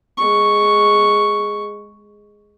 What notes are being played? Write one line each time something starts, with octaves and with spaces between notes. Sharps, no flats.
G#3 C#6